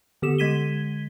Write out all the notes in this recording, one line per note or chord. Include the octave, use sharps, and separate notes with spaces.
D3 B3 G4 A4 E7
D3 G#3 G#6 B6 D#7 G7